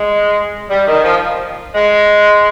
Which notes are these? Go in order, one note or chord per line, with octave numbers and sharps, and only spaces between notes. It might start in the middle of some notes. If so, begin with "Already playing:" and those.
Already playing: G#3
G3
D#3
F3
G#3